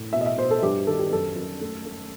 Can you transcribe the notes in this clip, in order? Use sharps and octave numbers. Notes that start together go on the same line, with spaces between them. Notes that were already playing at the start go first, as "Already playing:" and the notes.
Already playing: A2
B2 E5
D#5
E5
B2 C5
A4
G2 G4
D#3 A4
G4
F#2 A4
F#2
A3
A3